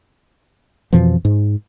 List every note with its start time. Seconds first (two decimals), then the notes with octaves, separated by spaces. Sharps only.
0.93 F2 B2 E3 F3
1.25 G#2